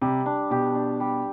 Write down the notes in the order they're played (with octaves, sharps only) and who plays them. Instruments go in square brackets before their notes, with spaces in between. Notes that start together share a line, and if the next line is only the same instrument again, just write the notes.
[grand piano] C3 [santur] G3
[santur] D4
[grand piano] B2 [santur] G4
[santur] D4
G3